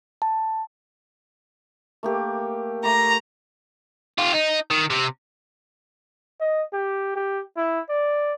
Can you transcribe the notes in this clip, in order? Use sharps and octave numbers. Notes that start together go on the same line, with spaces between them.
A5
A3 A#3 G4
A3 A#5 C6 D6
F4 G4
D#4
D#3
C3
D#5
G4
G4
E4
D5